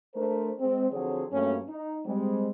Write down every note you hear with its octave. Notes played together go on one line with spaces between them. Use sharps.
A3 D4 A#4 C5
G#3 C4
D3 F3 F#3 C4 G#4 C#5
G2 F#3 A3 A#3 C#4
D#4
G3 G#3 C4